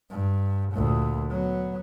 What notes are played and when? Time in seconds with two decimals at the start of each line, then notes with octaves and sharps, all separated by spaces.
0.11 G2
0.73 D2 A#2
1.31 F#3 B3